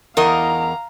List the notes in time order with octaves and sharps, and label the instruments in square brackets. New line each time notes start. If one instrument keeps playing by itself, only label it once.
[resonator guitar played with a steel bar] E2 A#4 D#5 [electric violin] F5 A#5